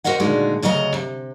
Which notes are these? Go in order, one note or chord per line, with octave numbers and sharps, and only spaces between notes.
F#4 A#4 C5 D#5 F#5
A#2 D3 D#3 G#3 F#4 D5
D2 C#3 F#3 D#5 A5 A#5
C3